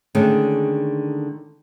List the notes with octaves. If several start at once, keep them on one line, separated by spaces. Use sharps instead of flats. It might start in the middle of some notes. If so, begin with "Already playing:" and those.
D3 D#3 G#3 A3 C#4